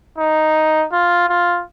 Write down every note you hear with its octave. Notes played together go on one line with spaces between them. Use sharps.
D#4
F4
F4